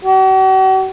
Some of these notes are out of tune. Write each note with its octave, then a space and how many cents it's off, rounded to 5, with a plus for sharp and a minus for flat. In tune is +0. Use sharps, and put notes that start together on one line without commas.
F#4 +45